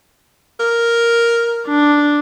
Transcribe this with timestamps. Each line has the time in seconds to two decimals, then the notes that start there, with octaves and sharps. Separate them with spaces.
0.59 A#4
1.66 D4